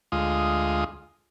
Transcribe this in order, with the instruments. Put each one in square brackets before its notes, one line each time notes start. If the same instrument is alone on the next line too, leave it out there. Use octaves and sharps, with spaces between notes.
[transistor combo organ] D2 G#3 F4 D#6